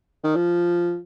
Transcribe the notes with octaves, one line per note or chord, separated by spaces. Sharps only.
D#3
F3